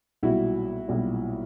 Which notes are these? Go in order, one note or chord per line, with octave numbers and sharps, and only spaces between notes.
B1 A#2 G3 E4 F#4
B1 A#2 G3